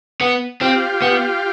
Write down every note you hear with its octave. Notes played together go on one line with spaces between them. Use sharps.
B3
C4 F4 G4
B3